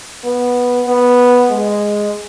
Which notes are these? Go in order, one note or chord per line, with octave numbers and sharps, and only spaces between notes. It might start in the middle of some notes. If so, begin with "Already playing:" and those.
B3
B3
G#3